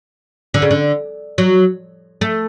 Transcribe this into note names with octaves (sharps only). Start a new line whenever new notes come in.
D3
C#3
D3
F#3
A3